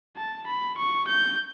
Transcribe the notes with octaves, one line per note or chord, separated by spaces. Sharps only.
A5
B5
C#6
G6